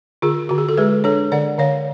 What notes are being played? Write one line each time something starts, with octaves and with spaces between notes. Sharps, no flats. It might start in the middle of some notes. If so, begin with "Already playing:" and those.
D3 F4 G#4
D3 F#4
G#4
A4
G#3 G#4 B4
D4 A4 C#5
D3 D5 F#5
D3 C#5 F5